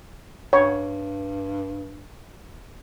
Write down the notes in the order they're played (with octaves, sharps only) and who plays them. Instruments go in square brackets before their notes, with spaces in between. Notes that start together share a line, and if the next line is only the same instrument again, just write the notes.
[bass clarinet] G2 [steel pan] C#5